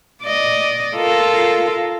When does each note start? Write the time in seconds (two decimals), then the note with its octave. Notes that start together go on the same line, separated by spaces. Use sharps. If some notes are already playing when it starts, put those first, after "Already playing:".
0.24 D5 D#5
0.96 F4 A4 A#4